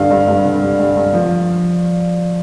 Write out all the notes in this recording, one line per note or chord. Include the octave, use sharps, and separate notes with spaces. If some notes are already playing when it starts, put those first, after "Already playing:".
Already playing: G2 D3 F5
G2
G2
D3
G3
G2
G2
F3